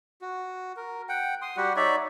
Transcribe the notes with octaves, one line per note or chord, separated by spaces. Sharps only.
F#4
A#4
F#5 G5
C6 D#6
G3 F#4 G4 F#5
D#4 C#5 D5 E5